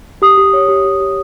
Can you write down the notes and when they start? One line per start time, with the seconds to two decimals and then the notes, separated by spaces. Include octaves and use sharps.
0.22 G4 D#6
0.38 G4
0.53 C#5
0.68 G4
0.85 G4
1.00 G4